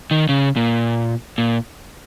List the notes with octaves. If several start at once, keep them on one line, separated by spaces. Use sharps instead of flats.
D#3
C#3
A#2
A#2